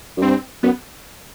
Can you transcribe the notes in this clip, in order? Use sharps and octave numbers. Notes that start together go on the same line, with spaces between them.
F#2
G2 C4
F#2 B3